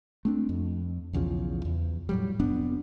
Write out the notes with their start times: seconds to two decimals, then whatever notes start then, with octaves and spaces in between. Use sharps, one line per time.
0.25 A3 C4 D4
0.49 F2
1.13 B1 E2 C#3 F3
1.65 E2
2.09 A2 F#3 G3
2.39 F1 F2 B3 D4